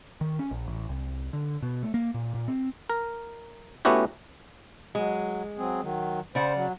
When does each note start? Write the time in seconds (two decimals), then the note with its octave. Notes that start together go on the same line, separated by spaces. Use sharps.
0.21 D#3
0.39 C#4
0.51 A#1
0.68 A1
0.89 C2
1.33 D3
1.63 B2
1.83 A3
1.94 A#3
2.14 A#2
2.35 A#2
2.48 C4
2.90 A#4
3.85 A3 B3 C#4 E4 F#4 G4
4.95 F#3 G#3
5.58 F#3 C4 G#4
5.82 D#3 F#3
6.35 C#3 C5 D5 F#5
6.56 F#3